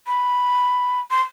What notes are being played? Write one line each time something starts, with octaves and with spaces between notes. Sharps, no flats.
B5
C6